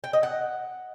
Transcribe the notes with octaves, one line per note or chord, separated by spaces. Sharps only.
G5
D#5
F#5